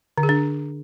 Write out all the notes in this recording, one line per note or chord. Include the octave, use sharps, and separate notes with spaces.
D3
G#4
D4